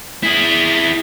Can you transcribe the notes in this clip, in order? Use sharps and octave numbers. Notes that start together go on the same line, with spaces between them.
E4 G#4